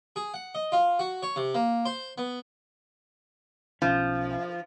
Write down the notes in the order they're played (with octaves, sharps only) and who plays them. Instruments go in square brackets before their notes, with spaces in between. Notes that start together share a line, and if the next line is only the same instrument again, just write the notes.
[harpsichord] G#4
F#5
D#5
F4
F#4
C#5
C3
A#3
C5
B3
[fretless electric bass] B1 C#4 [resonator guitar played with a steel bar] F3